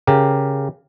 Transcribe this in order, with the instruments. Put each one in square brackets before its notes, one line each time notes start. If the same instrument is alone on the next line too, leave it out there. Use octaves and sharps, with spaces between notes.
[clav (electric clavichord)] C#3 G4 A#4